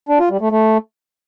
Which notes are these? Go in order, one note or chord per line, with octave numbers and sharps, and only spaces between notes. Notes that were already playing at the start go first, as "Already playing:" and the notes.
D4
F4
G3
A3
A3